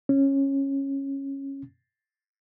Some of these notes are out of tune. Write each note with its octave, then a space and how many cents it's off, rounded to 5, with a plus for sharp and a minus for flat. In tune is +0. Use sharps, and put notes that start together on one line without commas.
C#4 -15